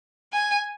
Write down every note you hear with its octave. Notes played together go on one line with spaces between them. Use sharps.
G#5